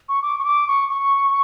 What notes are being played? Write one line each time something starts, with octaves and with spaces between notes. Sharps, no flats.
C#6
D6
C#6
D6
C#6
C#6